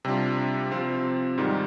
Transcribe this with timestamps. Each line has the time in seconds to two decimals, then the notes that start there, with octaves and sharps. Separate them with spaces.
0.05 C3 G3 D4 F4
0.71 C3 F3 C4 F4
1.38 G#2 D#3 G3